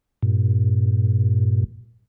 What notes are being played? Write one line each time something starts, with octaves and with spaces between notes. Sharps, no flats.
G2 A#2